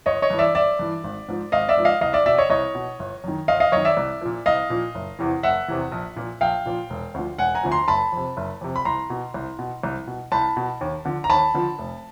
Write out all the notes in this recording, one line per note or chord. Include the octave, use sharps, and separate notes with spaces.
G1 C#5 D#5
C#5 D#5
G2 E3
D5 E5
G1 D5 E5
G2 E3
G#1
G#2 F3
G#1 D#5 F5
D5 E5
G#2 F3
D#5 F5
C2 D#5 F5
D5 E5
B2 D5 E5
C#5 D#5
C2 C#5 D#5
B2
G1
F#2 D#3
G1 D#5 F5
D#5 F5
F#2 D#3 C#5 D#5
D5 E5
C2
A#2 F3
C2 D#5 F5
A#2 F3
F#1
E2 C3 E3
F#1 E5 F#5
E2 C3 E3
A#1
A#2 F3
A#1 F5 G5
A#2 F3
E1
D2 D3 F3
E1 F#5 G#5
G#5 A#5
D2 D3 F3
A#5 C6
F#1 A5 B5
F2 C3
F#1
F2 C3
B5
C2 A#5 C6
B2
C2
B2
C2
B2
C2 A5 B5
B2
D#2
D3 F3
A#5
D#2 A5 B5
D3 F3
F1